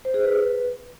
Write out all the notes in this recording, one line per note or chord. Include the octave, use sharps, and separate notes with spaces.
C5
G#4
B4